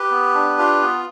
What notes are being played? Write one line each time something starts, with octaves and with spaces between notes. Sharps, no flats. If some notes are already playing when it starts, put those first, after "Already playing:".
Already playing: G4 B4
B3
D4
F4
B3